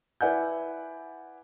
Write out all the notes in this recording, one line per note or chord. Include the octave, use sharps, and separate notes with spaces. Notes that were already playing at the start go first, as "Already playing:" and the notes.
E4 B4 D5 F#5 G#5 G6